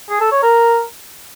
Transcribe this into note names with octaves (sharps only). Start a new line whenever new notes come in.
G#4
A4
C#5
A#4